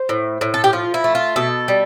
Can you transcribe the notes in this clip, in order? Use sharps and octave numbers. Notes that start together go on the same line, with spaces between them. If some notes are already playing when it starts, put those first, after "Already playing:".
Already playing: C5
A2
A2
A4
G4
F3 F4
E4
A3
F4
B2 A4
G3